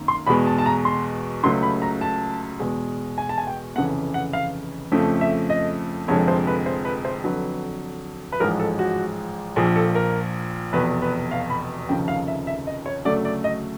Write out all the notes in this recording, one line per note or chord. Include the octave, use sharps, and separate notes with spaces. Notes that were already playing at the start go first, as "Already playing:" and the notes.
Already playing: G#1 F#2 D#3 A#3
C6
E2 B2 G#3 B5
A5
A5
A#5
C6
C#2 C#3 F#3 A3 C6
B5
A#5
A5
E2 B2 G#3
G#5
A5
G#5
G5
F1 F2 C#3 E3 F#5
F#5
F5
F2 C#3 F3 A3
E5
D#5
F1 F2 D3 F3 G#3 C#5
C5
B4
C5
B4
C5
F2 D3 F#3 B4
B4
A1 G#2 F3 G#3 A#4
A4
F#4
A#1 A#2 F3 G#4
A4
A#4
F1 E2 B2 B4
B4
F5
B5
F1 D#2 C#3 F3 G5
F5
E5
E5
D#5
C#5
D2 C#3 F#3 A3 D5
D5
D#5